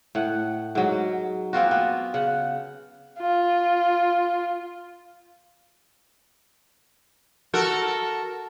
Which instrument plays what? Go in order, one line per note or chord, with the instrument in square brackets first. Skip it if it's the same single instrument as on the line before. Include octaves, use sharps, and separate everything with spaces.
[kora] A2 F#5
G#2 F#3
A#3 C4 F4 F#4
B3
C#3 F#5
[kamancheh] F4
[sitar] F#4 A4 A#4